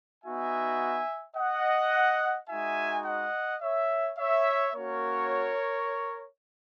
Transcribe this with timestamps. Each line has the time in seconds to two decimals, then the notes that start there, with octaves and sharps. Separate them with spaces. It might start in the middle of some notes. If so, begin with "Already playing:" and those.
0.24 B3 D#4 F#4 E5 G#5
1.37 D#5 F#5
2.49 G#3 D#4 F#4 E5 G#5
3.06 D#5 F#5
3.62 C#5 E5
4.18 C#5 E5
4.75 A#3 C#4 F#4 A#4 C#5